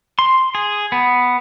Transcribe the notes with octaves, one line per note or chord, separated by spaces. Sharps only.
C6
G#4
B3